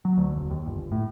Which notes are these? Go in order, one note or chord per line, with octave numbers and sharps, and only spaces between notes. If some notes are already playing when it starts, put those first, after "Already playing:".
F#3
D2
E1
D#2
G1
A2